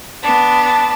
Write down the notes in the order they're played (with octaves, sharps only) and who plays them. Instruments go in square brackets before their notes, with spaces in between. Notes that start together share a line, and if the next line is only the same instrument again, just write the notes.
[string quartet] B3 D4